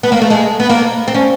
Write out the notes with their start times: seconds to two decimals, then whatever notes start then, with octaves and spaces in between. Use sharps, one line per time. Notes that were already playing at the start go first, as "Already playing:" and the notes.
0.03 B3
0.12 A#3
0.21 A3
0.30 G#3
0.60 B3
0.69 A#3
1.08 C4
1.14 C#4